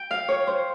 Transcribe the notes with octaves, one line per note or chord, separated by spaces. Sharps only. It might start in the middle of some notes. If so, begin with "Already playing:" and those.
Already playing: G5
F5
C#5
C5